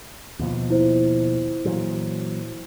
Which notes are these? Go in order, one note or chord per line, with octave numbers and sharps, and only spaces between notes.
D#2 B2 F3
E4 C5
A#2 E3 F#3